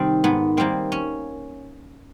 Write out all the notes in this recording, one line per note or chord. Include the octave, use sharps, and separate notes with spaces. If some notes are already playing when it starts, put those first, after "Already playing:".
Already playing: C3 D#3 G3 C4
G#2 B3
D#3 G3 A#3 C4
C#4